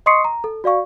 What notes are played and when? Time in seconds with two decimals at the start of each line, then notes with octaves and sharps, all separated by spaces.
0.06 D#5 C6 C#6 D#6 C7 C#7
0.25 A#5
0.44 A4
0.64 F#4 D5 F5 C#6